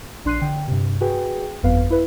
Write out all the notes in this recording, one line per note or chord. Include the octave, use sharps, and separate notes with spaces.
A#1 D4 C6 F#6 C7 D#7
D3 G5
G2 C3
F#4 G#4 B4 G5
G1 F2 B3 B4 F5
E4 B4